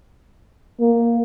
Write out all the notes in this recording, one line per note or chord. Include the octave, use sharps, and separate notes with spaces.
A#3